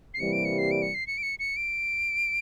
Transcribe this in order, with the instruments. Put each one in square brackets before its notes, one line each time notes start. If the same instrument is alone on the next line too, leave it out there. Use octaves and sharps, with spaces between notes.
[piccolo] C7
[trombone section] C3 E3 G3 A#3 [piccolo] C#7
[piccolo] D7
C#7
C7
D7
C#7
C7
C#7
D7
C#7
C#7
D7